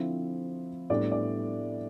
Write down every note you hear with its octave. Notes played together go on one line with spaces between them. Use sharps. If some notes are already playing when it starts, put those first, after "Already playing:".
Already playing: D3 F3 C4 E4
A2 G3 B3 D4 D5
D5